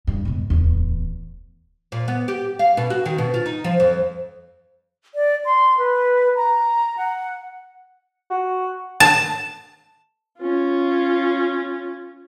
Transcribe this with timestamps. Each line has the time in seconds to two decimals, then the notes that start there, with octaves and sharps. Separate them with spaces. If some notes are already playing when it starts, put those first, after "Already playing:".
0.07 A1 G2
0.25 E1 B2
0.50 D1 E2
1.92 A#2
2.08 B3
2.28 G4
2.59 F5
2.77 B2
2.90 F#4
3.06 D#3
3.18 B2
3.34 F4
3.46 D#4
3.64 F3
3.80 F2
5.15 D5
5.45 C6
5.78 B4
6.36 A#5
6.97 F#5
8.30 F#4
9.00 A5
10.39 C#4 F4